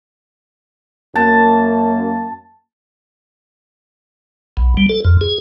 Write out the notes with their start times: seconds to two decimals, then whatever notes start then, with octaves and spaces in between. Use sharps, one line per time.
1.16 F#2 A#3 A5
4.57 B1
4.77 G3
4.89 A4
5.05 F2
5.21 G#4